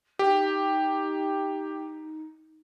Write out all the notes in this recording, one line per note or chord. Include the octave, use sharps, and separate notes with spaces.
D#4 G4